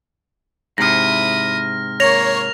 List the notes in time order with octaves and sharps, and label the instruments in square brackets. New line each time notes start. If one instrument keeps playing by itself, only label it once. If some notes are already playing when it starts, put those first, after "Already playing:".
[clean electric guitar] G#2 C3 [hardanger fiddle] E4 D#6 [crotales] F6 A#6
[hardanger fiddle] A#3 [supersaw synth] C#5 [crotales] A#6 F7